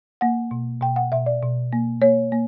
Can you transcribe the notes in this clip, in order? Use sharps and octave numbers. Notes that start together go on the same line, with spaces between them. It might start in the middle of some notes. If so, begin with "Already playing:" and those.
A#3 F#5
B2
B2 G5
F#5
B2 E5
D5
B2
A#3
A#3 C#5
A#3